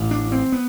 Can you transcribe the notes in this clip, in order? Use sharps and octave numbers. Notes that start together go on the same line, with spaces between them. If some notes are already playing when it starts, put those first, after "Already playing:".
Already playing: A1 A2
D4
C4
B3